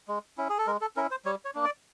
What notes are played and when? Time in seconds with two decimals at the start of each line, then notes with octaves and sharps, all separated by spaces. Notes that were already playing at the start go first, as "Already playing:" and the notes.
0.08 G#3
0.38 C#4 E4
0.49 G#4
0.58 A4
0.67 G#3 A#4
0.81 A4
0.96 C#4 E4 A#4
1.11 C5
1.25 G3 C#5
1.45 C#5
1.55 A#3 D4
1.65 D5